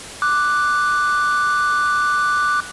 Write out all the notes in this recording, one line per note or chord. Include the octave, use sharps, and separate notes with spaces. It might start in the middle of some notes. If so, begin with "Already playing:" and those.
D6 F#6